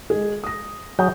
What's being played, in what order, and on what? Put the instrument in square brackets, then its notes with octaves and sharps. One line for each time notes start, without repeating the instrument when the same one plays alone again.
[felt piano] G#3 G#4
D#6 A#6
[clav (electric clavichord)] F#3 G#4 [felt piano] G6